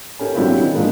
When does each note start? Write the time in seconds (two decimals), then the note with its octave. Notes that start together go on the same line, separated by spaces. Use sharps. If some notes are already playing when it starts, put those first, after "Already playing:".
0.19 C#4 G4 A4 A#4
0.34 F#3 C4 D4 E4 F4 G4
0.59 D#3
0.73 D#3 F3 G#3 A#3 D4 D#4